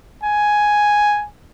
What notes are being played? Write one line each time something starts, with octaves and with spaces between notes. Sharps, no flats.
G#5